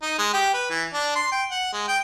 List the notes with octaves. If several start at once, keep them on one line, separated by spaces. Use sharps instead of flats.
D#4
G#3
G4
B4
E3
D4
C6
G5
F#5
G#3
G5